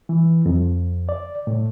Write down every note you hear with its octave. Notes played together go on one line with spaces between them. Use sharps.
E3
F2
D5
A2